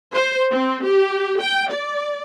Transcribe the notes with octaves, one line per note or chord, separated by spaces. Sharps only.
C5
C4
G4
G5
D5